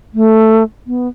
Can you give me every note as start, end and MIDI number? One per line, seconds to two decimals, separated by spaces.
0.14 0.63 57
0.87 1.08 59